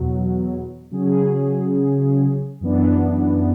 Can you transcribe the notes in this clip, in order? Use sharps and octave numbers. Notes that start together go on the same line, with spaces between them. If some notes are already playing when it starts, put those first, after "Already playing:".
Already playing: E2 B2 F#3
C#3 F#3 C#4 G#4
F#2 E3 B3 D4